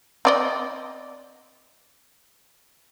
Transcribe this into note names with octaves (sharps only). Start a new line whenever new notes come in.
C4 D5 D#5